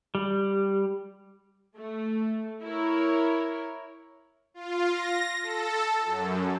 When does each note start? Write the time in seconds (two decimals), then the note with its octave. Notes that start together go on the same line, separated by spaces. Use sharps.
0.15 G3
1.76 A3
2.64 E4 A#4 C#5
4.54 F4
4.90 A#6
5.43 A4
6.05 F#2